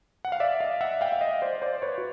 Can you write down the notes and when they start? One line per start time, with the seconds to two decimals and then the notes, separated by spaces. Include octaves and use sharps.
0.25 F#5
0.32 F5
0.40 D5 E5
0.60 D#5 F5
0.81 E5 F#5
1.01 F5 G5
1.12 E5
1.21 D#5 F5
1.42 C5 D5
1.62 C5 D5
1.82 B4 C#5
1.98 F#4